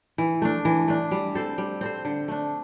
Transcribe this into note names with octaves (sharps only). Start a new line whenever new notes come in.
E3
A3 D4
E3
A3 D4
G3
C4 A4 C5
G3
C4 A4 C5
D3
A3 D4